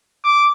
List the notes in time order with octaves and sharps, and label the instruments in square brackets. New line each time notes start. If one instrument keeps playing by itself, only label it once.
[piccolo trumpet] D6